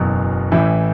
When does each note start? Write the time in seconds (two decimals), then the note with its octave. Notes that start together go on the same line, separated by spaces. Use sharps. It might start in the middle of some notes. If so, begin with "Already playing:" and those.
Already playing: F#1 E2 B2 F#3
0.52 A1 A2 E3 E4